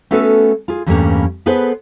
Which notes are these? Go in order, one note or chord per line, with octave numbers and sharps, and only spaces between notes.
A3 B3 C#4 F#4 A4 B4
F4 G#4
E2 G2 G3 A3 A#3 C#4
B3 G#4 A4 B4 C5